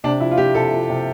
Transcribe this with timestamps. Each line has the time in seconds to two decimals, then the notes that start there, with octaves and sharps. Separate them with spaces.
0.04 C3 D4
0.20 F3 E4
0.31 F4
0.38 F3 G4
0.55 C3 A4
0.72 F3
0.90 C3